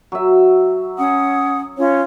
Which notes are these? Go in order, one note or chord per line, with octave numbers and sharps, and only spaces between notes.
F#3 E5
C#4 F#5 D#6
C#4 F4 C#5